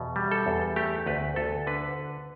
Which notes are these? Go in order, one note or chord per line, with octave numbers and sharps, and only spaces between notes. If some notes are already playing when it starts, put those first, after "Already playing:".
Already playing: E2 B2
G3
A4
E2
A3 G4
D2 B4
D2 A4
D3 B4